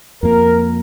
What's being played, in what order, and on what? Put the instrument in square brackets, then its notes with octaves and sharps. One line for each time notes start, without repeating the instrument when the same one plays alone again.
[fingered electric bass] F2 A#3 [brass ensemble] A#4